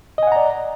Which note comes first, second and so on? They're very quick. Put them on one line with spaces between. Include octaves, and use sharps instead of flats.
D#5 G#5 F#5 A#5 D5